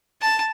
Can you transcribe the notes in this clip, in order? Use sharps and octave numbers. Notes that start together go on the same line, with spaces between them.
A5